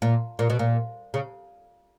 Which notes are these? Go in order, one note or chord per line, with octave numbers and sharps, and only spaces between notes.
A#2
A#2
B2
A#2
C#3